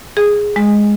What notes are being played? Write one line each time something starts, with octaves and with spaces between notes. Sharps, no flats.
G#4
G#3